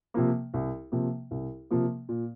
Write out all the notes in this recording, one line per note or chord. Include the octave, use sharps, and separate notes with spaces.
C3 F3 A#3
C2
C3 F3 A#3
C2
C3 F3 A#3
A#2